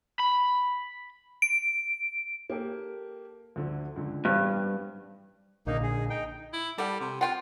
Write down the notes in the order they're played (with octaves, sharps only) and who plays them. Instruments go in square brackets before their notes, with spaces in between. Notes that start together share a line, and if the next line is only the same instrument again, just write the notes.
[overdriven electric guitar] B5
[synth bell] D7
[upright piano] A#3 G4 A4
D2 D3 F3
C#2 D3
[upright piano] A1 B3 C4 [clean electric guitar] G2
[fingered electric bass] A#1 A#2 D3 [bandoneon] A#3 D#4
[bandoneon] G#4
D#4 G5
[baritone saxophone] E4
[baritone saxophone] G3 [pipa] A4 F#5
[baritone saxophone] C3
[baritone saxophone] F4 [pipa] F#5 G5 C6